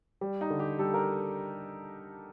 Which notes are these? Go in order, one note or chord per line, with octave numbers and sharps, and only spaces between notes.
G3
D#4
D3
G4
G3 A4
A#4